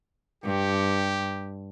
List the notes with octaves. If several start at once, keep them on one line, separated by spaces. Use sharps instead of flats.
G2 G4